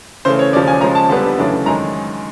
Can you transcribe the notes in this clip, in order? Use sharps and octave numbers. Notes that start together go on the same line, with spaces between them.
C#3 E3 A3 C5
C#5
D#2 C#3 F3 D5
G#5
C#3 F3 G#3 A#5
A5
F2 D3 G3 B3 D4
F#2 C#3 E3 A3 D4
F#2 D#3 G#3 A#5